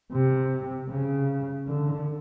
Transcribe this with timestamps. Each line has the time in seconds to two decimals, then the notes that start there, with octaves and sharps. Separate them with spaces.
0.12 C3
0.89 C#3
1.67 D3